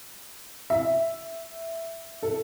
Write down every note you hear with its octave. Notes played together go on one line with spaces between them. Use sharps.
E5
A4